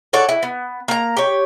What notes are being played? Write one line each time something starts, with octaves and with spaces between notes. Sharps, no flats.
A4 C#5 D5 F#5
E4
B3
A#3 A#5
G4 C#5